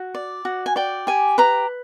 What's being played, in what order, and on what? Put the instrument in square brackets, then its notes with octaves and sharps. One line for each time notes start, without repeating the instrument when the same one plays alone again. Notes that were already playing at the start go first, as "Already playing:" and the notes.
Already playing: [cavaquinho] F#4
D5
F#4
G#5
D5 G5
G4 G#5
B4 A#5